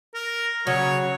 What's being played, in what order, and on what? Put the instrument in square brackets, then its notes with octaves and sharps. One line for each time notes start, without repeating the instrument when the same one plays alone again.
[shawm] A#4
[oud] C#3 [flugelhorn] F#3 [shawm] C#5